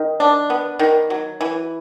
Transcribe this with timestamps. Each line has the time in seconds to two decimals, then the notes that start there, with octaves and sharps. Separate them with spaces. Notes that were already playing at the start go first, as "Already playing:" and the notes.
Already playing: D#3
0.20 D4
0.50 B3
0.79 D#3
1.10 F#3
1.41 E3